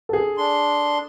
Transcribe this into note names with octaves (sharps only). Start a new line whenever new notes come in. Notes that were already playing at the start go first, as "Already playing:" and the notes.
G#4 A4
D4 C6